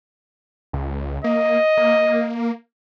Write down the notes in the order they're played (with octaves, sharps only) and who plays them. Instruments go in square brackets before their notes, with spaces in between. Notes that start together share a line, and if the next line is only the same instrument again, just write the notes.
[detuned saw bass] C#2
[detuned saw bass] A#3 [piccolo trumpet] D#5
[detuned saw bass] A#3